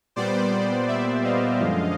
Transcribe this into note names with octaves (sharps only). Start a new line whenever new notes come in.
A#2 G3 B3 C5 D5
D5 E5
D#5 F5
F#2 D3 F3 G#3